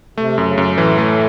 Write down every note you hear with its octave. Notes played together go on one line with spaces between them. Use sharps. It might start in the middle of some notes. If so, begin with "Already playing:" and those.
C3 A3
F#2
C#3
F#2
A2
E3
A3